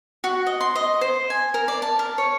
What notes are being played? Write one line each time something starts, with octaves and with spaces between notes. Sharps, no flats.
F#4
D#5
C6
D#5
C5
G#5
A#4
D5
A5
A#4
C#5